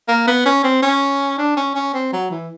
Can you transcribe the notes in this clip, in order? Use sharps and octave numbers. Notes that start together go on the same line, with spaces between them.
A#3
B3
C#4
C4
C#4
D4
C#4
C#4
C4
F#3
E3